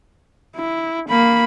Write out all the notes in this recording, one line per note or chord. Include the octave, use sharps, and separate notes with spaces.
E4
A#3 B5